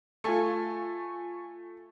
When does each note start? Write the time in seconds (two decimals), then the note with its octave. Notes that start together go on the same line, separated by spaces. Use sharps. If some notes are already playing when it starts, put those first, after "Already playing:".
0.24 A3 F4 A4 G#5 C#6